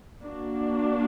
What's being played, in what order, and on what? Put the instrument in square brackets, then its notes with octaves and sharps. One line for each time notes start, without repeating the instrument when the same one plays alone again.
[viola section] A#3 D4 F#4